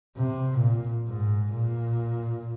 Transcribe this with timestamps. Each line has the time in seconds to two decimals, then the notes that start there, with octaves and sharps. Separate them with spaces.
0.17 C3
0.59 A#2
1.08 G#2
1.53 A#2